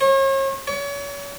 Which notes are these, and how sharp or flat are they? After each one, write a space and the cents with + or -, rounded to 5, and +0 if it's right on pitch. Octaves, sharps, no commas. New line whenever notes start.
C#5 -40
C#5 +35